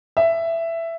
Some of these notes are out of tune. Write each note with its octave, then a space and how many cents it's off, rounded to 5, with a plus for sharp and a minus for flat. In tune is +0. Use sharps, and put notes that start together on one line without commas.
E5 +10